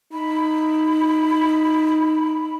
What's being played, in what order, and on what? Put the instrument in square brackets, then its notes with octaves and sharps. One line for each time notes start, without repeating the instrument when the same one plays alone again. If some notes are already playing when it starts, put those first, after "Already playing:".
[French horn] D#4 [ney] B5